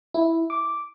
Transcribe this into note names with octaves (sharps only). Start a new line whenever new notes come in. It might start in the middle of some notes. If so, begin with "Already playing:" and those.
E4
D6